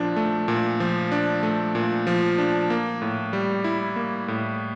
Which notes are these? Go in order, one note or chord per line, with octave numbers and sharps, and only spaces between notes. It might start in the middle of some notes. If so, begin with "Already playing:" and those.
Already playing: A#2 F3 D4
A3
A#2
F3
D4
A3
A#2
F3
D4
A#3
A2
G3
E4
A#3
A2